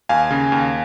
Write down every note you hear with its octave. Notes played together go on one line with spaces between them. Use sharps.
D#2 F5 G#5
C#3
D#2